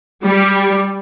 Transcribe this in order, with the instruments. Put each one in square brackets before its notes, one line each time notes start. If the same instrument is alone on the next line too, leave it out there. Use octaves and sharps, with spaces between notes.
[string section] G3